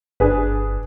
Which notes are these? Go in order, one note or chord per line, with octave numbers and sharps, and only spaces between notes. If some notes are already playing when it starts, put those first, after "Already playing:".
G1 D4 G#4 B4